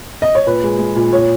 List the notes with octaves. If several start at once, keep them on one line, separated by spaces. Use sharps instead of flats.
D#5
C#5
A#2 B4
G#3
G#3
A#2
A#2 C#5